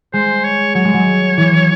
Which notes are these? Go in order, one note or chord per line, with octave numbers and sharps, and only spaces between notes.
G#3 C5
C#5
F#3 C#5
G#3
F#3
E3